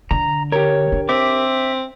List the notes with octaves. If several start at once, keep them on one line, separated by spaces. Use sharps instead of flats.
D3 A#5
G4 A#4 C#5
D4
C4 E5 D6